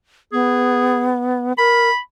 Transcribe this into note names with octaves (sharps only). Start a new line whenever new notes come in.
B3 G#4
A#4 B5